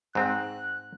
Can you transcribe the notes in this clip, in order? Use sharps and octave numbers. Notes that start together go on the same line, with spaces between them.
G#2 C4 F#6